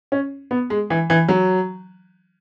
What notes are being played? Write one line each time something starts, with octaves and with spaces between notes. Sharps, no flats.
C#4
B3
G#3
E3
E3
F#3